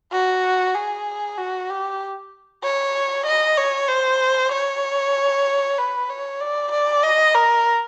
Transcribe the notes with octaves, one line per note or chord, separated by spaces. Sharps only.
F#4
G#4
F#4
G4
C#5
D#5
C#5
C5
C#5
B4
C#5
D5
D5
D#5
A#4